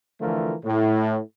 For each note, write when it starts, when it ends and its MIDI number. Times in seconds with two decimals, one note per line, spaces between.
0.21 0.55 50
0.21 0.55 52
0.21 0.55 53
0.21 0.55 57
0.21 0.55 65
0.21 0.55 70
0.65 1.20 45